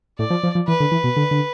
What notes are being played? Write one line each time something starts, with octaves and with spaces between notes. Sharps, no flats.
A2 D5
F3
F3
F3
E3 B4
D3
E3
B2
D3
D3